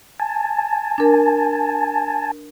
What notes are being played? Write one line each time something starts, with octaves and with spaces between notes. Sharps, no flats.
G#5 A5
D4 A#4